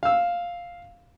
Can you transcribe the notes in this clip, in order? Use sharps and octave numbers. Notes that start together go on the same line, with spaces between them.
F5 E6